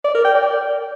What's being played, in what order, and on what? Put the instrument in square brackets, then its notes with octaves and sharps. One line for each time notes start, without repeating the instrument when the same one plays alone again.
[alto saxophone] D5
A#4
G5
D5